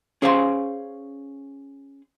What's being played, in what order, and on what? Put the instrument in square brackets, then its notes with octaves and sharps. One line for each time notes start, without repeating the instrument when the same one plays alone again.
[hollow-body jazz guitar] C#4 G#4 C5 F5 G#5 C6